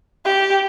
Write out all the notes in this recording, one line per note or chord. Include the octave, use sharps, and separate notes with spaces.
G4